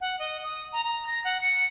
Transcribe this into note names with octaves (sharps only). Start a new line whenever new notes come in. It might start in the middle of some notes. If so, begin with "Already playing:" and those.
F#5
D#5
D#6
A#5
A#5
A#6
F#5
C#7